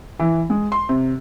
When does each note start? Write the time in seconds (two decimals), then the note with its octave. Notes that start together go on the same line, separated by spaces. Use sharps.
0.20 E3
0.50 G#3
0.72 C6
0.89 C3